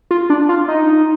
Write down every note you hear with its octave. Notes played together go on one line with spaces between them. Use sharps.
F4
D4
F4
D#4